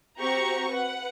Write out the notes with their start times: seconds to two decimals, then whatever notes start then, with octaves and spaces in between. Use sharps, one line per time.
0.20 C4 F#4 G4 A#5 C#6
0.72 B4 F#5